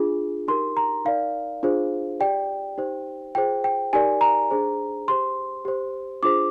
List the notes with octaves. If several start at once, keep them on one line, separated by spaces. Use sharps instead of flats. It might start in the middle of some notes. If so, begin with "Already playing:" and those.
Already playing: D4 F4 G#4
D#4 G4 A#4 C6
A#5
D#4 A#4 D5 F5
D4 F4 G#4 C5
G4 D5 G5
D#4 G4 C5
F4 G#4 C5 G5
G5
D#4 G4 A#4 D5 G#5
A#5
D4 G#4 C5
G4 C5 C6
G4 C5
D4 F4 G#4 C5 D6